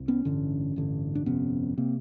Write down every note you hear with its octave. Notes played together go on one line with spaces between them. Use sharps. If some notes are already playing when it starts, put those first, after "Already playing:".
Already playing: C2
B3 C#4
A1 G2 D3
A1 G2 D3
D4
G1 F2 C3 B3 C#4
C3 A#3 C4